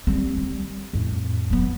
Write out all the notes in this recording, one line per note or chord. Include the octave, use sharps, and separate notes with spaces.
G3 C4
G3
F2 A2
F#3 B3